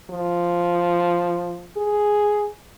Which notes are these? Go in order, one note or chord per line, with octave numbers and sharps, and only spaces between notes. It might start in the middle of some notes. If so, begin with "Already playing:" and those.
F3
G#4